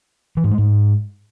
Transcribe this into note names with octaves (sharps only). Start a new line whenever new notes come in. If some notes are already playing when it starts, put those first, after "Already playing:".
E3
G#2
G#3
G#2